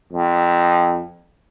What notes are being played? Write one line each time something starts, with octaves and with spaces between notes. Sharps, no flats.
F2